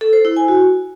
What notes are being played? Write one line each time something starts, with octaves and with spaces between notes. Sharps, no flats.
A4
C5
E4
G#5
F#4